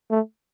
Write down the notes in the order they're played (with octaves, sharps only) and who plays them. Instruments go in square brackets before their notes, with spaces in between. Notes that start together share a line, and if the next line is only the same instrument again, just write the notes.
[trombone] A3